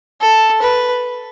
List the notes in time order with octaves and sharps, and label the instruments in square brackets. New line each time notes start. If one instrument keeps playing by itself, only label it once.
[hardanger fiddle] A4
B4